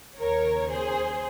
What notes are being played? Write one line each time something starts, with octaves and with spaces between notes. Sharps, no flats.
D#2 C#3 A#4 C#5
G#4 C5